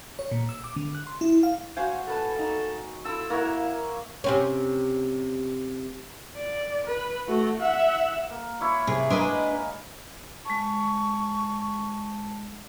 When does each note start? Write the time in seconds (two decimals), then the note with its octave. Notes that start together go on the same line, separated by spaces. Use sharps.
0.19 C#5
0.31 A#2
0.49 E6
0.64 D6
0.76 D3
0.95 F#6
1.07 C6
1.21 E4
1.43 F5
1.77 F#4 C5 F5 F#5 G#5
2.07 A2 A4 B4 A5
2.36 A#3 D#4
3.05 E4 F4 A4 E6
3.30 A#3 E4 A#4 C#5 E5 F#5
4.24 C3 C4 C#4
6.37 D5
6.86 B4
7.28 A3 F#4
7.60 E5 F#5
8.30 A#3
8.60 E4 C#5 D5
8.87 C3 G#4
9.10 G#3 A#3 D4 B4 D#5
10.45 G#3 A5 C#6